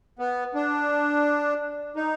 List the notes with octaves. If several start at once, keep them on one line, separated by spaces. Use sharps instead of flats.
B3
D4
D#4